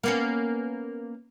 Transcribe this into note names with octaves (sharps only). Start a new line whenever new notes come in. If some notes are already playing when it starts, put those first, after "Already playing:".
A#3 B3 C#4